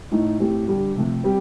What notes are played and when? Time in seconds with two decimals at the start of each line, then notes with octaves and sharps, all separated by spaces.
0.11 A2 A3 D#4
0.39 A2 A3 C4 G4
0.68 D3 G3 D4 G4
0.95 C3 F3 A3
1.24 G3 C4 G4